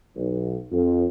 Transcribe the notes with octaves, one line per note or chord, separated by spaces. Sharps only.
B1
F2